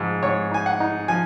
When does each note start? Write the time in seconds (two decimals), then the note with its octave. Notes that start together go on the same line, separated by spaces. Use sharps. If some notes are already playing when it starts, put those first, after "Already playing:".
Already playing: G#2 F3 G#3
0.23 G#2 C#5
0.51 D#4 G#5
0.66 F#5
0.80 D#4
1.08 F3 G#5